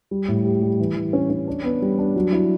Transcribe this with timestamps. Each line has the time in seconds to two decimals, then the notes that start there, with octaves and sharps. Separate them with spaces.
0.11 G3
0.28 A2
0.45 G4
0.62 G3
0.80 E3
0.96 E3
1.13 C#4
1.30 C#4
1.48 D4
1.64 B3
1.82 G3
1.99 D4
2.16 F#3
2.33 E4